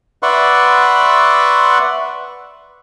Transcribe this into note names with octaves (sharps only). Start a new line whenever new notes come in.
B4 D5 E5 F#5 C6 C#6